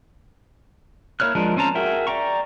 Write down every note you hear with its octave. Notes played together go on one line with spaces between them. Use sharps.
A#3 E4 C#5 F6 F#6
F3 G#3 D4 A#4
C4 C#4 C5 A5 A#5
F#4 G#4 A#4 E5 G5
D5 G5 A#5 C#6